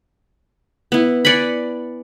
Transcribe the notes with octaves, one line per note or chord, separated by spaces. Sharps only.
B3 E4
D5 F#5 G#5 B5